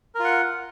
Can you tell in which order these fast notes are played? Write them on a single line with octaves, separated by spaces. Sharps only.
A#4 F4 F#5